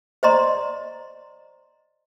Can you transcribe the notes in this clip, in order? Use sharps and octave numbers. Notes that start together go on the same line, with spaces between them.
C5 D5 D#5 A#5 C6